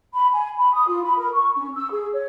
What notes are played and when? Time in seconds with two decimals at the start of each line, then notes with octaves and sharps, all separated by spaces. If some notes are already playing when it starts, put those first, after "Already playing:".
0.13 B5
0.32 G#5
0.58 B5
0.72 D#6
0.87 F4
1.03 B5
1.17 A#4
1.33 C#6
1.56 C#4
1.74 E6
1.91 G#4
2.13 C#5